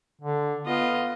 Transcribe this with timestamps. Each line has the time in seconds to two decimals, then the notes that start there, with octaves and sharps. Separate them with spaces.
0.21 D3
0.66 B3 F4 D#5